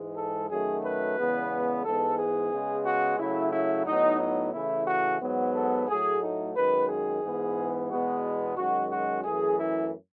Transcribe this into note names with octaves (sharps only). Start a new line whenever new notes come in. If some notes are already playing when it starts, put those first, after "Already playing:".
Already playing: G#2 E3 G#3
A4
F#2 D#3 F#3 A3 G#4
B4
E2 C#3 G#3 B3
G#2 E3 G#3 B3 A4
G#4
C#3 G#3 B3
F#4
C#3 F#3 A3 E4
E4
A2 F#3 B3 D#4
D#4
C#3 E3 A3 E4
F#4
G#2 F#3 B3
A4
A2 F#3 A3 G#4
D#4
F#2 D#3 G#3 B4
G#4
G#2 E3 B3
E2 B2 G#3 B3 F#4
F#2 D#3 G#3 F#4
F#4
F#2 E3 A3 G#4
E4